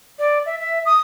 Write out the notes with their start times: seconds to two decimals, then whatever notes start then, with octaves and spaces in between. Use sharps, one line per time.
0.19 D5
0.46 E5
0.59 E5
0.86 D#6